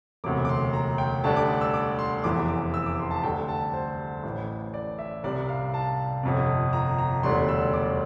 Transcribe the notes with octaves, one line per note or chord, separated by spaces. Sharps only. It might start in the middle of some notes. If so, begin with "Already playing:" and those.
E1 D2 C3 D6
D6
C6
A#5
G5
D2 D3 G3 A5
D6
D6
E6
D6
C6
F1 E2 E3 D6
D6
E6
D6
C6
A5
D2 D3 G3 G5
A5
C5
A1 A2 E3
D5
E5
C2 C3 G3 D5
F5
A5
G1 F2 C3
A#5
A#5
E1 D2 D3 G3 C6
E6
D6